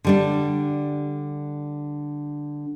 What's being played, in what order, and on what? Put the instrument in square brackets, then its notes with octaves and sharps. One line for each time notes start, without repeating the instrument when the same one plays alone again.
[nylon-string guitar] D3 G3 D4